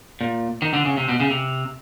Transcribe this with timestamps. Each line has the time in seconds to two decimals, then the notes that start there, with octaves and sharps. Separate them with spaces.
0.21 A#2
0.62 D#3
0.74 D3
0.85 C#3
0.97 C3
1.09 B2
1.20 C#3
1.30 C3